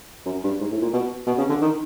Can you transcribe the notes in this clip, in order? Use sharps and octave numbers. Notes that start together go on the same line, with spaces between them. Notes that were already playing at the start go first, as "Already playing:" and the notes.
F#2
G2
G#2
A2
A#2
B2
B2
C#3
D3
D#3